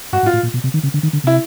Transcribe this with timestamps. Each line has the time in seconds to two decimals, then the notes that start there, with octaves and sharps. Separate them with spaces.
0.13 G2 F#4
0.23 G#2
0.26 F4
0.33 A2
0.43 A#2
0.54 B2
0.64 C3
0.74 D#3
0.83 C#3
0.94 D3
1.03 D#3
1.13 D3
1.24 C3 E4